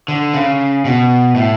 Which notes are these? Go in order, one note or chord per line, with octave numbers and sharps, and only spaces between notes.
D3
C#3
B2
A2